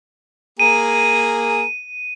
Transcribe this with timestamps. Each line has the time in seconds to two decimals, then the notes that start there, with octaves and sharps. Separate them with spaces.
0.60 A#3 G#4 A#4 D#7